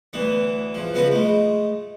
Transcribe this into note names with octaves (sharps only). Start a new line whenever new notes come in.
D2 E3 B3
E2 F3
C#2 F3 B3 F#4 B4
G#3 A3